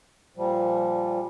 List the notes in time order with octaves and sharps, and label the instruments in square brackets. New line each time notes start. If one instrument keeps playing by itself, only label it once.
[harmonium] A#2 F3 G3